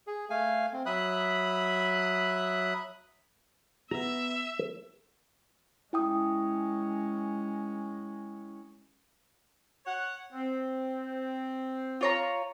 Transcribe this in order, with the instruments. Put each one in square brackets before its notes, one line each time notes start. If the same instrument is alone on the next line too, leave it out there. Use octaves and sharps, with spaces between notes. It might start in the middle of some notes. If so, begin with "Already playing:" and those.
[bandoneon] G#4
A3 F5 G#5
C4
F#3 E5 B5 D#6 F#6
[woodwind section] B3 [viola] E5 [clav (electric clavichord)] A#5
[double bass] G#3 C#4 [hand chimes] E4 G5 D#6
[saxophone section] C#5 F#5
C4
[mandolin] F4 C#5 A#5